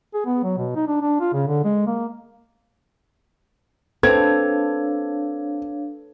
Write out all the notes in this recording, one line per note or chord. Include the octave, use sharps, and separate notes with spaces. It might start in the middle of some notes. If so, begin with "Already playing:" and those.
G#4
B3
F#3
B2
D#4
D4
D4
F4
C#3
D3
G#3
A#3
C4 D4 A4 B4 C#5 F5 G#6